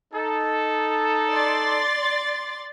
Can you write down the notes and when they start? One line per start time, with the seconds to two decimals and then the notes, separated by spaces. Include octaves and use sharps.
0.13 D#4 A4
1.30 D5 C6 A6